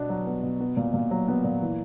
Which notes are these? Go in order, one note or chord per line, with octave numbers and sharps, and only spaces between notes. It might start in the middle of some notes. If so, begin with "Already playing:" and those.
Already playing: B2 B3 D4
F#3
B3
B2
B3
A#2
A#2
F#3
B3
A#2
E3